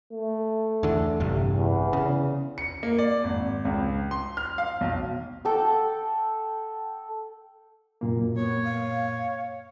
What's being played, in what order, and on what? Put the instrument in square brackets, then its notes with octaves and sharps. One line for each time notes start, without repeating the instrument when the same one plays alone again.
[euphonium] A3
[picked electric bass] E2 D3
A1 G2 C3
[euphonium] E2
[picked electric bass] C#3
[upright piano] C#7
A#3
D5
G#1
C#2
C6
F6
F5
B1
[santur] A4 F#5 G5 D6
[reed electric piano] F#2 A#2 A#3
[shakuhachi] B3 [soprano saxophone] C#5
[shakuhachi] F5